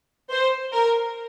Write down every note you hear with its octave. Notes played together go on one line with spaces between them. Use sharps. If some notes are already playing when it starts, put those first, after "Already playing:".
C5
A#4